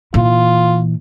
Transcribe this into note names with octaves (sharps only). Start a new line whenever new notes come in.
A#2 E3 F4